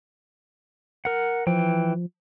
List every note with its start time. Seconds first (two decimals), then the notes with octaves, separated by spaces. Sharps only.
1.05 A#4 F#5
1.47 E3 F3 G5